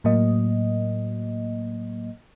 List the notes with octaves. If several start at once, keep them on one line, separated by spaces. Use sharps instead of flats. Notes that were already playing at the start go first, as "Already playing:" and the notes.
A2 F#3 A#3 D#5